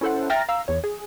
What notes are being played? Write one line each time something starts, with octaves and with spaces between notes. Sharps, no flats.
C#4 E4 A4 C5 F#5
E5 G5 A#5 F6 A6 A#6
F5 A#5 E6
E2 C#5
G#4